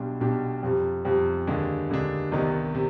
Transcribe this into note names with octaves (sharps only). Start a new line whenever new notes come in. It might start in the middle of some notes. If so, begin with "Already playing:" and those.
Already playing: B1 B2 G3 D4 G4
B1 B2 G3 D4 G4
F2 C3 G3
F2 C3 G3
D#2 D3 G#3 D4
D#2 D3 G#3 D4
C2 C3 D#3 B3 D#4
C3